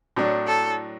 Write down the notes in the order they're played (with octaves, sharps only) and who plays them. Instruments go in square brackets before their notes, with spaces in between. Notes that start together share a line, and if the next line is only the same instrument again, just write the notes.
[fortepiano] A2 F#3 D4
[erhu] A4